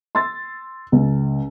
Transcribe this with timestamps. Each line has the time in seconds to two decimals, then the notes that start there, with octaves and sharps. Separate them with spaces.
0.15 C6 E6 A6
0.92 C#2